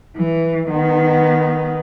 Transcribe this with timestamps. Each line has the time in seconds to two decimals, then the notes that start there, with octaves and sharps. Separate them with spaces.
0.17 E3
0.70 D#3 B3